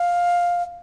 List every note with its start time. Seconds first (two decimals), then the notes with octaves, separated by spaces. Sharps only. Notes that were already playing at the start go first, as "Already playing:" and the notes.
Already playing: F5